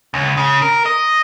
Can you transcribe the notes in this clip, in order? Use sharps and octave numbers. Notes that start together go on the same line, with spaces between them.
C#2
C#3
A#4
D#5